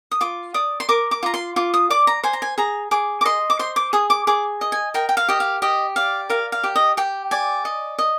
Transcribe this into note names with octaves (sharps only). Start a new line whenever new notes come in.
D#6
F4 D6
D5 D#6
C6
A#4 D6
D6
F4 A#5
C6
F4 D6
D#6
D5 D6
A#5
C5 G#5
A#5
G#5
G#4 A#5
G#4 D6
D6
D#5 C6
D6
C5 C6
D6
G#4 D#6
D6
G#4 D6
D#5
G#5
A#4 G5
G5
F5
G4 D#5
F5
G4 D#5
D5 F5
A#4 F5
F5
G4
D#5
G4 G5
D5 G#5
D#5
D#5